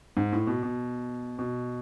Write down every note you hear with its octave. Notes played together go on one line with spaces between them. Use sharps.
G#2
A2
B2
B2
B2